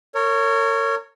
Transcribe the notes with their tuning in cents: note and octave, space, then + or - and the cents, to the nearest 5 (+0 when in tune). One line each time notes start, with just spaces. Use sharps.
A#4 -40 C#5 +0